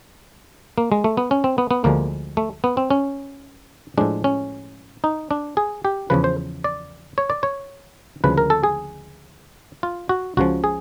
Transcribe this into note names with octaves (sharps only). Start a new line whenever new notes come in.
A#3
G#3
A3
B3
C#4
C4
B3
B3
D2 D3 F3 G#3 A#3
A3
B3
C4
C#4
A2 F3 G#3 D4
C#4
D#4
D4
G#4
G4
E2 C#3 F3 B4
C5
D5
C#5
D5
C#5
D2 C#3 F3 G#3 B4
A#4
A4
G#4
F4
F#4
C#2 C#3 F3 F#4
G#4